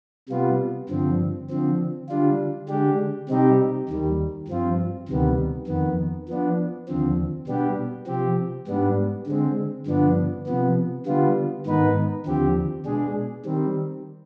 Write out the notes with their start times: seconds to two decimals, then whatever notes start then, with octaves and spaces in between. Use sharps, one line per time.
0.29 C3 G3 B3 F4
0.89 G2 D3 F3 C4
1.50 D3 F3 C4
2.09 D3 G3 D4 F4
2.69 D3 G#3 D4 G4
3.29 C3 G3 C4 D#4 G4
3.89 D#2 D#3 G3
4.48 G2 F3 C4 F4
5.08 D2 C3 D#3 G3 B3
5.68 F2 D#3 B3
6.28 F3 B3 D4
6.88 D#2 D3 F3 C4
7.47 B2 G3 B3 D4 G4
8.07 C3 F3 C4 G4
8.67 G#2 G3 B3 D4
9.27 D3 G#3 C4
9.86 G2 D3 F3 B3 D4
10.46 C3 F3 B3
11.06 D3 G3 B3 F4
11.66 G#2 D#3 B3 D#4 B4
12.26 D#2 D3 F3 C4 G4
12.86 B2 G#3 D4 G#4
13.45 D#3 G3 C4